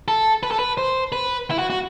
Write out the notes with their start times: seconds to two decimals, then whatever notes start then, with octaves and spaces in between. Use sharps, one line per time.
0.08 A4
0.43 B4
0.51 A4
0.59 B4
0.78 C5
1.12 B4
1.51 E4
1.59 F#4
1.70 F#4